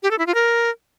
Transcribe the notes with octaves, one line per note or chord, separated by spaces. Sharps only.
G4
A4
E4
F4
A#4